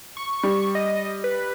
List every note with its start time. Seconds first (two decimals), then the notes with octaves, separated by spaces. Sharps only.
0.17 C#6
0.43 G3
0.75 D#5
1.24 B4